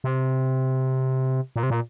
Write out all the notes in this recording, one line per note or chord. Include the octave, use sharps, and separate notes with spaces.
C3
A#2
C3
A#2